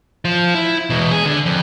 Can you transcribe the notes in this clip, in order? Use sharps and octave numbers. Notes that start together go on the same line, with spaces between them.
F3
E4
E2 B2
G#4
D3
F2